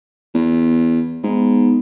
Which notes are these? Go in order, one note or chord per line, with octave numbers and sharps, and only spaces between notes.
E2
G#2 B3 D#4